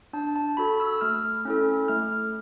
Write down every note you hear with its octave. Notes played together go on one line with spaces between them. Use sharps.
D4 A5
A5
F#4 A4 B5
E6
A3 F6
C#4 E4 A4
A3 F6